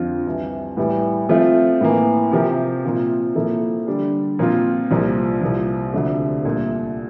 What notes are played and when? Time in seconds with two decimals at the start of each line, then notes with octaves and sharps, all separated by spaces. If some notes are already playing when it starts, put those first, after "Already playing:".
Already playing: F2 D3 F3 C4 F4
0.26 C2 C3 E3
0.77 A2 E3 G3
1.29 F3 A3 C4 F4
1.81 A2 E3 A#3
2.31 C3 F3 C4 G4 A#4
2.84 A#2 F3 C4 F4
3.35 A#2 F3 A#3 E4 A4
3.87 D3 G3 D4
4.39 A#2 F3 C4 F4
4.91 C2 A#2 F3
5.41 C2 A#2 F3
5.94 D2 C3 F3 A3 D4
6.44 C2 A#2 A3